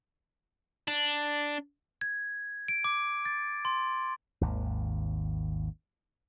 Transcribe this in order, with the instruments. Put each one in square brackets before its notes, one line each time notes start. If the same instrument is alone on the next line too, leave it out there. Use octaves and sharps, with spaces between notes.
[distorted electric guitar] D4
[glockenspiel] G#6
D7
D6
A6
C6
[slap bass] G#1 D#2